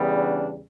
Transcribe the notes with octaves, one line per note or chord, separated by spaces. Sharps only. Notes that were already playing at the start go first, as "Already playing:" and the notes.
Already playing: E2 C#3 E3 G3 B3
D4